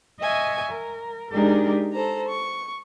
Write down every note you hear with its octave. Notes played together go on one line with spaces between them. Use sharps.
D#5 E5 G#5 C#6
A#4
G#3 D4 D#4 G4 G#4 A#4
A4 C5 A#5
C#6